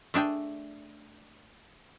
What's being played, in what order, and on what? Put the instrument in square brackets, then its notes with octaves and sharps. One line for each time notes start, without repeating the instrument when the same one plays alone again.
[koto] A3 D4 G#4 G5